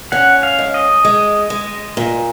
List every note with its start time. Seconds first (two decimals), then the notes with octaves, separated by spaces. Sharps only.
0.12 C#4 F#5
0.43 F5
0.59 G#3
0.74 D#5
1.05 G#3
1.50 G#3
1.97 A#2